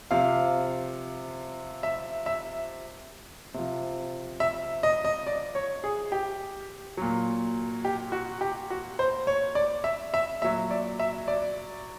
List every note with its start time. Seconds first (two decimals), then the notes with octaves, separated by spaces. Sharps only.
0.11 C3 F3 F5
1.83 E5
2.26 E5
3.54 C3 F3
4.40 E5
4.83 D#5
5.05 D#5
5.27 D5
5.55 C#5
5.84 G#4
6.12 G4
6.97 A#2 F#3
7.85 G4
8.12 F#4
8.41 G4
8.70 F#4
8.99 C5
9.27 C#5
9.55 D5
9.84 E5
10.14 E5
10.41 A#2 F#3 E5
10.71 D5
11.00 E5
11.28 D5